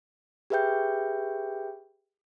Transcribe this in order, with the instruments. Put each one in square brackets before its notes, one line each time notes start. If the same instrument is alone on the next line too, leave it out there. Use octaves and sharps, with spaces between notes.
[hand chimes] G4 G#4 B4 E5 G5 G6